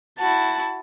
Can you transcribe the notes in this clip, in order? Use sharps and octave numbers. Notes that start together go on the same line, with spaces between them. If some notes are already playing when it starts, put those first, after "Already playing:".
E4 F#4 A5